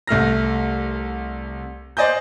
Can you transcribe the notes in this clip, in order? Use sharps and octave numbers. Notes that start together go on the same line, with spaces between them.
C2 A3 F6 A#6
C5 D5 D#5 G#5 G6